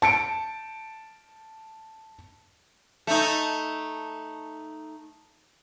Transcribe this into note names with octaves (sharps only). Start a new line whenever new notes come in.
A5 C#7 D7
A3 D#4